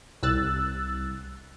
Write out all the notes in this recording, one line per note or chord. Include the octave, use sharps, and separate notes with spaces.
C2 E6 F#6 A6